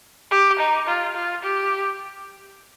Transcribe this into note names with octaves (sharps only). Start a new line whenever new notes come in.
G4
D#4
F4
F4
G4